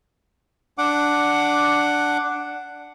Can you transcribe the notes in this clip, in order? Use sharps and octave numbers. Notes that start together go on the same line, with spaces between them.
D4 F#5 D6